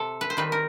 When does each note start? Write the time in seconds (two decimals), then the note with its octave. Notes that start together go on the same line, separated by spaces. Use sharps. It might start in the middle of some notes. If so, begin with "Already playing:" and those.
Already playing: C3 A4
0.21 B4
0.30 C5
0.37 D#3 G3 C4 B4
0.52 A#4